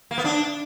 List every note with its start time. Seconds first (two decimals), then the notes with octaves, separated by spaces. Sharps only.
0.11 A#3
0.18 B3
0.25 D4